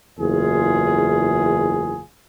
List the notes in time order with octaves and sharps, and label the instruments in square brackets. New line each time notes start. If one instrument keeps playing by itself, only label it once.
[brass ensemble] F#1 E2 F4 G#4